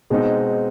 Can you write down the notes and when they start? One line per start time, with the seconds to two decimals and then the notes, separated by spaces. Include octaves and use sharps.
0.10 B2 G#3 C4 D#4